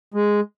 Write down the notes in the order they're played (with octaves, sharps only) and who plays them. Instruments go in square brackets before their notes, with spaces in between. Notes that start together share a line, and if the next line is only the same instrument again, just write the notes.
[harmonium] G#3